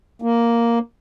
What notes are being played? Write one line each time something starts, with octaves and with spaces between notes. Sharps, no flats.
A#3